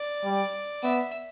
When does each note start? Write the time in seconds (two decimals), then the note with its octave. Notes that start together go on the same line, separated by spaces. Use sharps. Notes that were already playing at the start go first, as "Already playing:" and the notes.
Already playing: D5
0.24 G3
0.83 B3 E5